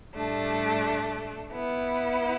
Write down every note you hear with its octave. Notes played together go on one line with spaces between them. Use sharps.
A2 G3 A3 D4
B3 E4